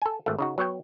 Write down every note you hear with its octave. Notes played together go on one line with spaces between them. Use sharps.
A4 G#5
G#1 A3
C#3 D#4 F#4
F#3 B3 C#5 G5